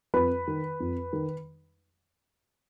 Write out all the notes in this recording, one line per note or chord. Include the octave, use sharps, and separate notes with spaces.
F2 B4 B5
D#3
F2
D#3